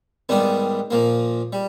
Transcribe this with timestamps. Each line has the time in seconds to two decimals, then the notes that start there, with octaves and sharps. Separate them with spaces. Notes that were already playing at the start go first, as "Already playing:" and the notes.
0.29 G#2 D#3 G3 B3 D4
0.91 A#2 F3 A#3
1.53 G3